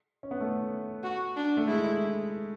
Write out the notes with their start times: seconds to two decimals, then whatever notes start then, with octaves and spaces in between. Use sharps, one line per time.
0.23 C#4
0.31 B3
0.40 A3
1.03 F#4
1.36 D4
1.57 A3
1.67 G#3 E4